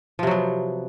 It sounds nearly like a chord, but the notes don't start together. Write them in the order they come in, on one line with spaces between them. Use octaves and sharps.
F3 C3 F#3 B3